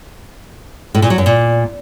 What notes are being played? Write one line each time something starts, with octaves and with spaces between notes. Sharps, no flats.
A2
A#2
F#3
F#2
A#2